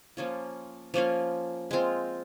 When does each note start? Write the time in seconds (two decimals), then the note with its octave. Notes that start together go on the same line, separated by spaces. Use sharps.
0.17 F3 A#3 C#4 F4
0.94 F3 A#3 C#4 F4
1.71 G#3 C4 F4